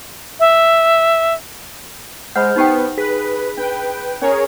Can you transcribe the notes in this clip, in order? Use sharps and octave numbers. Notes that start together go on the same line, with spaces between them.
E5
G#3 C5 F#5 B5 F6 G6
B3 D#4 G4 G5
G#4 B4 B6
D4 B4 G5
C#4 G#4 A#4 C#5